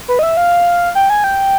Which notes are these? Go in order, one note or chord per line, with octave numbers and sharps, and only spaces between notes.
B4
D#5
E5
F5
G5
G#5
G5